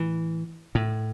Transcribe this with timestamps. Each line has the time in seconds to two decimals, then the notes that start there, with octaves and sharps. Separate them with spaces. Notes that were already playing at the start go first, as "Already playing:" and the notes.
Already playing: A2 E3
0.75 A2